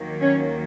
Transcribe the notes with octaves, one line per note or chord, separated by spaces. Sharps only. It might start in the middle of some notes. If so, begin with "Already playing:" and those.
Already playing: D#2 D#3 F#3 A#3
C#4 C#5